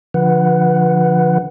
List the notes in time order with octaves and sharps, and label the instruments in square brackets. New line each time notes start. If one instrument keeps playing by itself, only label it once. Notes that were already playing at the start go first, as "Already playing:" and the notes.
[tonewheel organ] D3 F3 B4 F#5